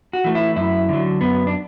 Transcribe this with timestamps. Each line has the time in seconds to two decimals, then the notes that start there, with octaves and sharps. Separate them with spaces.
0.13 F#4
0.24 E3 A3
0.35 E4
0.56 F#2 E4
0.89 D3 F#3
1.21 F#2 B3
1.47 D4